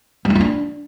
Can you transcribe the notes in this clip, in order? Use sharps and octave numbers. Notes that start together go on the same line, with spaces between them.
G3
D#4
F4
D4